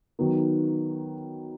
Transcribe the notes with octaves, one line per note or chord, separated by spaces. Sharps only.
D#3 F#3 B3 D#4